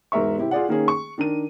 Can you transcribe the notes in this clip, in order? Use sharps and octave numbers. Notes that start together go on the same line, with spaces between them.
E1 G#2 A#4 E5 C#6
C3 E4 G4
F4 G#4 D5 F#5
D#3 A#3 C#4 G#4
C#6
D#3 D4 A#4 D#7